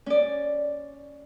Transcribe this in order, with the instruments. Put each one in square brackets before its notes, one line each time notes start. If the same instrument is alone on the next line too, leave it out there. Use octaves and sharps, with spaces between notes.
[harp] C#4 D5